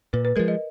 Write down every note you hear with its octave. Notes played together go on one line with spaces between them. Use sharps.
A#2 B4
B4
F3 G#3 A#4
D#5